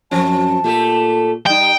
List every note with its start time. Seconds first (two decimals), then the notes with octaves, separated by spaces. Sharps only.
0.11 F#2 F3 C4 A5
0.64 A#2 A3 G4 A4
1.46 G3 D#4 G5